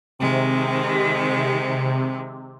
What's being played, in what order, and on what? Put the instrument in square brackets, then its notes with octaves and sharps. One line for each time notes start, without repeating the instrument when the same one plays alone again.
[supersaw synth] C3 [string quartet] D#3 G#3